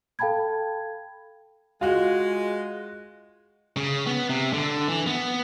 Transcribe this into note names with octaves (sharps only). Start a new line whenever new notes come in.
A4 F5 G5 A5 B5 G#6
G#3 F4 F#4
C#3
B3
C3
D3
E3
B3